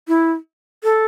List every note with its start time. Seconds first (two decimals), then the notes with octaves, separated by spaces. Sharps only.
0.08 E4
0.84 A4